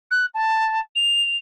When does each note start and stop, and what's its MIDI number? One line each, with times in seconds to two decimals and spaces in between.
0.11 0.26 90
0.35 0.80 81
0.96 1.37 101